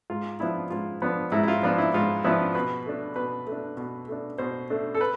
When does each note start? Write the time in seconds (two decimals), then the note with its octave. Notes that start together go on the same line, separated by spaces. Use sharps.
0.10 G#2 F4
0.40 F3 B3 D4 E4
0.70 G#2 F4
1.02 F3 B3 D4
1.32 G#2 E4
1.43 E4
1.48 F4
1.63 F3 B3 D4 F4
1.78 E4
1.94 G#2 F4
2.24 F3 B3 D4 E4
2.55 B2 B4
2.86 A3 D4
3.16 B2 B4
3.47 A3
3.52 D4
3.77 B2
4.08 A3 D4
4.38 B2 C5
4.70 A3 D4
4.94 A4
5.01 B4